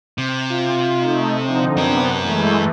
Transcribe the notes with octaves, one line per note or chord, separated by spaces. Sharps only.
C3
F4
A3 D#4
D3 F3 C4 D#4
F#2 C3 B3 D4 A#4
E3 G#3 A3